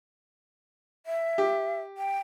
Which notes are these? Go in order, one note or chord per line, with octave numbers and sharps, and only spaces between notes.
E5
G4
G5